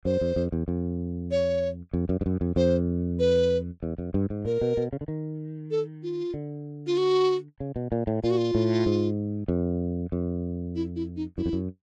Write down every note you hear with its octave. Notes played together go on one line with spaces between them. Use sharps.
F#2 C5
F2
F2
E2
F2
C#5
F2
F#2
G2
F#2
F2
F2 C5
B4
E2
F2
G2
G#2
A#2 A#4
B2
B2
C#3
D3
D#3
A4
F4
D3
F4
F#4
C#3
B2
A#2
A2
A#2 F4
F#4
F4
A2
G#2
F2
F2
E4
E4
D#4
F#2 E4
F2
F#2